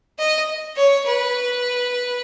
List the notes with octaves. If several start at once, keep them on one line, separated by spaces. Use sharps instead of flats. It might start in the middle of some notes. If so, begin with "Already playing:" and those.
D#5
C#5
B4